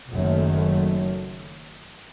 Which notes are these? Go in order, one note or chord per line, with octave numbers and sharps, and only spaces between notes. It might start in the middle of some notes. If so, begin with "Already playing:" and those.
F#1 F#2 D#3 F#3 A3